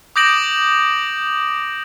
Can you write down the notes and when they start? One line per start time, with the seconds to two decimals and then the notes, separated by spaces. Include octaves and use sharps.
0.16 D6 D#6 G6 A#6 D7 F#7